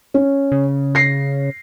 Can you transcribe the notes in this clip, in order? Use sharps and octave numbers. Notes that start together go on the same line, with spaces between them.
C#4
C#3
A#6 C7